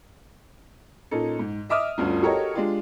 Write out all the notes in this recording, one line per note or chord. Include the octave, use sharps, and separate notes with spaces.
A#2 C#4 D#4 A4
G#2
D#5 E5 D6 D#6 F6
G1 D2 C#4 F4
F#4 G4 A4 A#4 C#5 D#5
G#3 D4 F4 G4